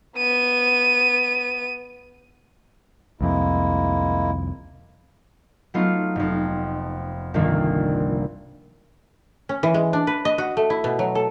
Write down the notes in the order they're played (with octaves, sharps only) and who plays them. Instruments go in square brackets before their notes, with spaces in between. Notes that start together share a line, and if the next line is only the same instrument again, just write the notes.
[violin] B3 D#7
[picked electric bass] C2 F2 [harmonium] G#3 A#3 E4
[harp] F#3 A3 B3 D#4 F4
F1 F2
G1 C2 D#3 F3 A#3
[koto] C#4
E3
G#3
D4
B4
D#5
F#4
A3
E4
B2
F#3
A4